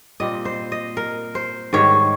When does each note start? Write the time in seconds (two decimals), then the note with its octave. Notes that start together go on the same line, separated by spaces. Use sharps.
0.20 A#2 G3 C4 D#5
0.45 C5
0.72 D#5
0.97 A#4
1.35 C5
1.73 G#2 D#3 G3 C#5